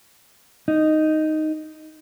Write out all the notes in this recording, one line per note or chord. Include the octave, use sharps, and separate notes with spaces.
D#4